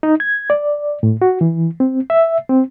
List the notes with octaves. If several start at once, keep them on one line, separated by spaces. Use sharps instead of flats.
D#4
G#6
D5
A2
F#4
E3
C4
E5
C4